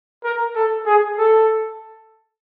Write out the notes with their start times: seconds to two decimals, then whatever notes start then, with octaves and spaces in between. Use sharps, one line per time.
0.24 A#4
0.56 A4
0.86 G#4
1.18 A4